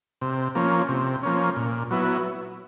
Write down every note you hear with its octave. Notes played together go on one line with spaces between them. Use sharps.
C3
F3 A#3 C#4
C3
F3 A#3 C#4
A#2
F#3 B3 E4